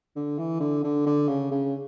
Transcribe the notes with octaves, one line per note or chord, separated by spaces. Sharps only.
D3
E3
D3
D3
D3
C#3
C#3